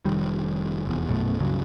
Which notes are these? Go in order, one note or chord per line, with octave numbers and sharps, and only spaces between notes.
F1 D#3 G3
F1 E2
A#1 F#2 B2 A3
C#2 G2 C#3 F#3